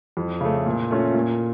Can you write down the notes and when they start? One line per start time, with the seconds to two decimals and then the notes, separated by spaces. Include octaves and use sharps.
0.17 F2
0.41 C#3 A3
0.66 A#2
0.90 A3 C#4 F4
1.14 A#2